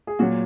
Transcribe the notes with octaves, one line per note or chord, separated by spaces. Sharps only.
G#4
A#2 F#3 F#4